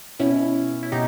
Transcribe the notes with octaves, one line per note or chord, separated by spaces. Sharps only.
B2 C#4 E4
E4
B2 D#4 G4